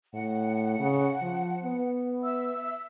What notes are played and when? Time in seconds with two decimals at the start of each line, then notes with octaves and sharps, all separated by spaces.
0.14 A2 F#5
0.80 C#3
1.22 F3
1.64 B3
2.23 E5 E6